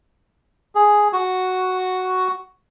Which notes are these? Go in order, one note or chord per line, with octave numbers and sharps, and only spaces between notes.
G#4
F#4